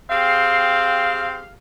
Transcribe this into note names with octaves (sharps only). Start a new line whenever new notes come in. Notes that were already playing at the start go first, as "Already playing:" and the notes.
C4 G4 G#4 F5